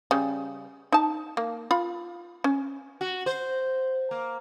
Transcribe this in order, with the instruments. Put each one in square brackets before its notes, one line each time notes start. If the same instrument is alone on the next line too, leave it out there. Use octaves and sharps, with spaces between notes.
[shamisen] C#3 G3
D#4 A5
A#3
F4 B5
C#4
[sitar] F#4
C5
A#3